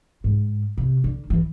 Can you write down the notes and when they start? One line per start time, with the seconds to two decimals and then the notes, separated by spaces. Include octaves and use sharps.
0.24 G#2
0.78 C3
1.04 D3
1.30 E3